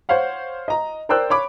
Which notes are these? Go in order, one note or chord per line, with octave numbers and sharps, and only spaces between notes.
C5 C#5 F5 F#5
D#5 A#5
A#4 C5 D5 G5 E6 F#6
C#5 B5 D6